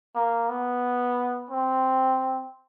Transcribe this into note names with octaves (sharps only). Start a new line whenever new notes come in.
A#3
B3
C4